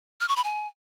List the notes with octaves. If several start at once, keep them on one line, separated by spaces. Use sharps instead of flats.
F6
C#6
B5
G#5